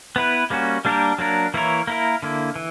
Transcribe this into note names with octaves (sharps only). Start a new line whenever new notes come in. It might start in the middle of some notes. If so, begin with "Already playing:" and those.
B3 E4 B4
G3 A#3 C#4 F#4
G3 A#3 D4 G4 A#4
F#3 A#3 D4 A#4
E3 A#3 E4 A#4 C#5
A#3 E4 A#4
D3 A#3 E4
E3